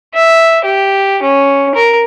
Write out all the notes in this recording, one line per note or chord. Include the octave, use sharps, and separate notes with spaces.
E5
G4
C#4
A#4